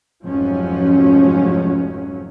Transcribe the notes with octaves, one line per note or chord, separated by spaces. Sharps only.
F1 G#2 F3 F#3 C#4